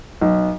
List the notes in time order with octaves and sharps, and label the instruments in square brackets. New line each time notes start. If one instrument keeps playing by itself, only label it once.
[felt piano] B1